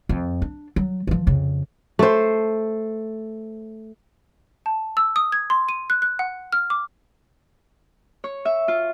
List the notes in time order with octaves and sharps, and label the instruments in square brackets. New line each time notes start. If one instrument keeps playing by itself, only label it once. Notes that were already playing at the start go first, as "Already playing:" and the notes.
[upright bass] F2
D4
F#3
E3 F3
F2 C#3
[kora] A3 C5
[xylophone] A5
E6
D#6
G#6
C6
D#7
F#6
F#6
F#5
F6
D6
[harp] C#5
E5
F4